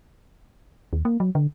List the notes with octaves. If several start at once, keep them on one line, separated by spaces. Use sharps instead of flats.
D#2
A#3
F#3
D3